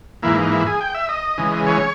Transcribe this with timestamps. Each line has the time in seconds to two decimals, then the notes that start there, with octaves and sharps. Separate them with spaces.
0.23 G#2 E3 A#3 E4
0.37 D#4
0.51 E4
0.67 G#4
0.81 G5
0.95 E5
1.09 D#5
1.38 C#3 E3 G#3
1.67 C#5